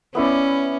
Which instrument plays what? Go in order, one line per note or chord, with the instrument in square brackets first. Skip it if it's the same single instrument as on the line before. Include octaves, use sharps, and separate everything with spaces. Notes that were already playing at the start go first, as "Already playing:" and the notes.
[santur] B3 E4 B4 D5 [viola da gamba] C#4